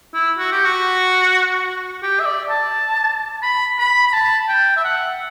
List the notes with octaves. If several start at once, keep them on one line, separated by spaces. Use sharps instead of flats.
E4
F#4
G4
F#4
G4
E5
D5
A5
B5
B5
B5
A5
G5
E5
F#5